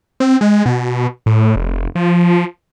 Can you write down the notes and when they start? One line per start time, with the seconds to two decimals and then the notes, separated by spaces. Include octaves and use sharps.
0.20 C4
0.41 G#3
0.66 B2
1.26 A2
1.56 F1
1.95 F3